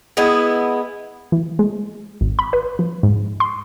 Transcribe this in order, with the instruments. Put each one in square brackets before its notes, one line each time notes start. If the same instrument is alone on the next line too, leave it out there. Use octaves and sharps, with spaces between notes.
[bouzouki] G#3 B3 E4
[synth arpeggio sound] E3
G#3
G#1
B5
B4
F3
G#2
C6